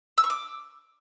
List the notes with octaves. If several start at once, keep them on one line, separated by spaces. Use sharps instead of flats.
E6
C#6
D6